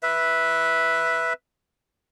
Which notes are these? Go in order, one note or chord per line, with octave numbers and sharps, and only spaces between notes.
B4 E5